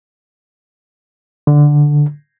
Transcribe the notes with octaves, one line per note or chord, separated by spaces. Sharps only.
D3